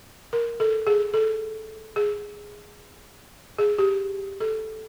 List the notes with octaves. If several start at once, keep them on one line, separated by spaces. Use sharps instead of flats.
A#4
A4
G#4
A4
G#4
G#4
G4
A4